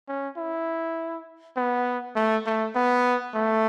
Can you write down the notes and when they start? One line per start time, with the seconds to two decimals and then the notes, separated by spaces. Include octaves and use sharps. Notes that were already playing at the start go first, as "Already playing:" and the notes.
0.08 C#4
0.37 E4
1.57 B3
2.16 A3
2.46 A3
2.75 B3
3.35 A3